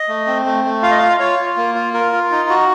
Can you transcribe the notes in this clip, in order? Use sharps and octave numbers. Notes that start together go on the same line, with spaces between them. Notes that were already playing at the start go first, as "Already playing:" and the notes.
Already playing: D#5
A3
C4
A3
A3
F4 F5
D#5
F4 F5
F4 C#5
F4
A#3
F4
F4 A#4
F4
D#4
F#4